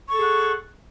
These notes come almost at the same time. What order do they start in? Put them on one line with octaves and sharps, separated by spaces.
C#6 A4 G#4 F#5